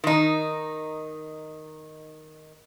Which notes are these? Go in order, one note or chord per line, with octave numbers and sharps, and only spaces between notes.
D#3 D#4